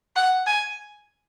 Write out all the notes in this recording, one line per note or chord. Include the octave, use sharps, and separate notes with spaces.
F#5
G#5